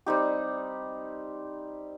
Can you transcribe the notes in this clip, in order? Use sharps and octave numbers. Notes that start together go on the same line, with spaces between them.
G3 C4 D#4 G4